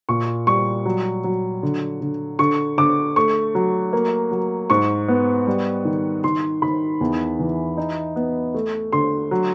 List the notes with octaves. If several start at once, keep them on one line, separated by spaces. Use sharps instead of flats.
A#2 C#6
G3 C#6
F#3
F#3
D3
D3
D3 C#6
D3 D6
A3 C#6
F#3
A#3
F#3
G#2 C#6
B3
G3
D#3
D#3 C6
D#3 B5
E2
E3
D#4
B3
A3
D3 C6
F#3